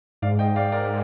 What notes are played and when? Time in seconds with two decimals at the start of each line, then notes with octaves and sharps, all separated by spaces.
0.22 G#2 D5 F5
0.39 D#5 G5
0.56 D5 F5
0.72 A#4 D5